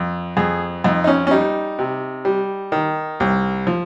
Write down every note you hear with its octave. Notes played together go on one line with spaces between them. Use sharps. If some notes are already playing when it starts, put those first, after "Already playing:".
Already playing: F2
F2 G#4
F2 D#4
D#4
C#4
C#4
G3 D#4
C3
G3
D#3
C2
F3